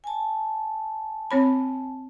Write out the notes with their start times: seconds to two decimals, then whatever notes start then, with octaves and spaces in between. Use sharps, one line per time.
0.04 G#5 A5
1.31 C4 C#5 B5